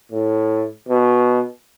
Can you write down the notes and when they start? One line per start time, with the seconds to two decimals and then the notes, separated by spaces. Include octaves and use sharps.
0.12 A2
0.88 B2